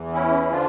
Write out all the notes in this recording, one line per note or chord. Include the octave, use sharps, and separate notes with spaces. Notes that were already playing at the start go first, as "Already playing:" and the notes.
Already playing: E2 E3
C#4 E4
D3 F3 D4 F4